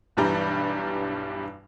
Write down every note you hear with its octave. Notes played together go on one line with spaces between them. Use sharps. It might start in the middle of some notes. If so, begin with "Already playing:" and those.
B1 G2 E3 G3 A#5 G6